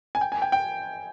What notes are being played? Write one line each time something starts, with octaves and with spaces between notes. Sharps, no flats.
G#5
G5
G#5
G5
G5